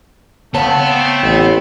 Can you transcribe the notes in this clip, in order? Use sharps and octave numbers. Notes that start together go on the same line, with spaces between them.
C#3 A3 B3 C4 C#5 F#5 A5
A1